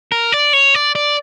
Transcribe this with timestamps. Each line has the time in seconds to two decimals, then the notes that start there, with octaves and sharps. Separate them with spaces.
0.12 A#4
0.32 D5
0.53 C#5
0.75 D5
0.95 D5